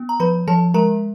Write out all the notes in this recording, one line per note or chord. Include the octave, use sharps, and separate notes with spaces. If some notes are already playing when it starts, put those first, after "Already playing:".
Already playing: B3
A#5
F3 B4 B5
F3 A4 A5
G#3 A#4 A#5